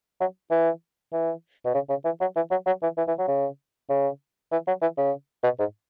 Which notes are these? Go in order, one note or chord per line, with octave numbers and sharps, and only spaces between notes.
F#3
E3
E3
B2
C#3
C#3
E3
F#3
E3
F#3
F#3
E3
E3
E3
F#3
C#3
C#3
E3
F#3
E3
C#3
B2
G#2